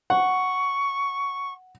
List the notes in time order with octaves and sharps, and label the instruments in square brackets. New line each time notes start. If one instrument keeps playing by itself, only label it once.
[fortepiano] F#5 [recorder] C#6